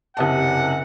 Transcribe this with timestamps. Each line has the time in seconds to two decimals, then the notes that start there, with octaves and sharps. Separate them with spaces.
0.17 F#1 C3 F#5 A5